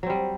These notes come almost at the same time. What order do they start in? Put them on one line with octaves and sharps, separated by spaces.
F#3 C4 G3